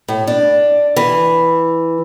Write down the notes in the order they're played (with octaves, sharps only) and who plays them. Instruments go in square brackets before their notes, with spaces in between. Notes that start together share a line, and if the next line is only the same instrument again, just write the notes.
[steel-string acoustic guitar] A2
D4
E3